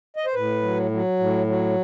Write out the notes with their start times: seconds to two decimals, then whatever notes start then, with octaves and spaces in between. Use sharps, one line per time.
0.16 D#5
0.26 C5
0.34 A2 B4
0.62 F#3
0.91 F#3
1.19 A2
1.47 F#3